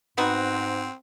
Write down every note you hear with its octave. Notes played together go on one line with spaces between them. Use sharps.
G#2 B3 C4 D#4 F#4